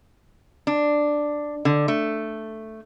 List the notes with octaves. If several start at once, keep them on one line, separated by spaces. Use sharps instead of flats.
D4
D3
A3